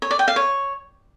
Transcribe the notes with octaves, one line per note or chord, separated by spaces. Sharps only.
C#5
D5
G5
F5
C#5